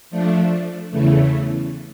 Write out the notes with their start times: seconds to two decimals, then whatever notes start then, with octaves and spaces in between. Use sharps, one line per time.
0.10 F3 A3 D4
0.91 E2 C#3 E3 A3